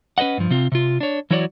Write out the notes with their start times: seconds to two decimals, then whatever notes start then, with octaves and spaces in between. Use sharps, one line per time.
0.18 C#4 B4 C5 D#5 F#5
0.38 G2 F3
0.50 C3 C4 F4
0.72 C3 F4
1.01 D4 C#5
1.30 E3 F#3 E4 F#4 C#5 D5